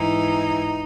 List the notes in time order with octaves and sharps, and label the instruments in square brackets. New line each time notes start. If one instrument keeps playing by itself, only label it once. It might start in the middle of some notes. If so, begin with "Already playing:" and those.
Already playing: [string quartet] G#2 E3 D#4